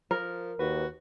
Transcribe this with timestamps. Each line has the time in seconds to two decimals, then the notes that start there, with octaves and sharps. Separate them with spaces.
0.11 F3 A#4
0.59 D#2 F#4 B4